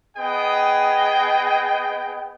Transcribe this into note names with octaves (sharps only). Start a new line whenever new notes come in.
B3 G#4 D#5 G5